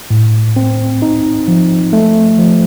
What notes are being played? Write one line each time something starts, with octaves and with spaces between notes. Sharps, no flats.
A2
C4
D#4
F3
A3
F3